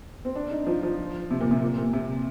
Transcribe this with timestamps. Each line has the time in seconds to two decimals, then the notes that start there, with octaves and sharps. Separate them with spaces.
0.25 C4
0.36 D4
0.51 D#4
0.67 F3
0.83 F3
1.31 C3
1.41 A#2
1.51 C3
1.62 A#2
1.78 A#2
1.93 C3